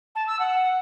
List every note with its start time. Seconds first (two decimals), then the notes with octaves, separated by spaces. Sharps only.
0.15 A5
0.27 E6
0.39 F#5